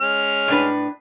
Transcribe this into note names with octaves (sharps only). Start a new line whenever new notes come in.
G#3 C#4 F6
A2 D4 B4